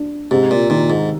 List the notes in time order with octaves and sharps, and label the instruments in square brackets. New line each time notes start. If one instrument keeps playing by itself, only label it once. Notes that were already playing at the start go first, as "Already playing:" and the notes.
Already playing: [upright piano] D4
[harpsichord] G#2 [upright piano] C3
[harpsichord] A#2
[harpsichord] A#2 [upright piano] D#3
[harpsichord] G#2